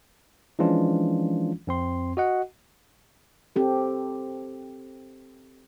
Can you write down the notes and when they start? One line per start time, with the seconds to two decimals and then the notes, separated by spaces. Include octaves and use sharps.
0.59 E3 F3 G#3 C#4 D4 F4
1.67 F2 C4 C6
2.17 F#4 D#5 F#5
3.56 C4 G4 A4